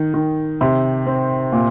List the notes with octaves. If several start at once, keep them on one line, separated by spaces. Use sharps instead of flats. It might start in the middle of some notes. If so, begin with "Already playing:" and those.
Already playing: D#3
D#3
C3
C4
A#2